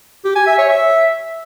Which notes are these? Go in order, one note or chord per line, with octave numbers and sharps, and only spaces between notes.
G4
G#5
E5
C#5
E5